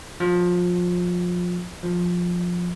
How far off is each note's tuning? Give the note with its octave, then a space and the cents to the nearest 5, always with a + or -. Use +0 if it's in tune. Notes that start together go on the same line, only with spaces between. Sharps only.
F3 +25
F3 +15